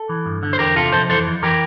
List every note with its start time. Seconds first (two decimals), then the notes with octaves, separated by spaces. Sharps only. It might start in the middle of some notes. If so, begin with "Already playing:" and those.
Already playing: A4
0.09 E3
0.26 G2
0.43 D3
0.53 C5
0.59 E2 G4 A#4
0.76 C3 F4 A4
0.92 F2 A4 C5
1.09 E3 A4 C5
1.27 F2
1.42 E3 G4 A#4